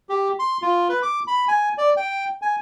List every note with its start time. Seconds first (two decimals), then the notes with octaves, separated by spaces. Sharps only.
0.09 G4
0.39 C6
0.62 F4
0.89 B4
1.02 D6
1.27 B5
1.48 G#5
1.78 D5
1.97 G5
2.42 G#5